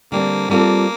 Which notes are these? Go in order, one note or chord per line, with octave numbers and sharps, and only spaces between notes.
D3 G3 A#3 C4
G3 A#3 C4 F4 A4